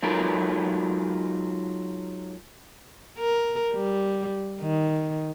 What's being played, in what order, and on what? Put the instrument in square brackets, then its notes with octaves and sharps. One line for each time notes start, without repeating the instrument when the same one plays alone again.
[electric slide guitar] F#3 G#3 D#4 F4 A4 A#4
[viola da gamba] A#4
G3
D#3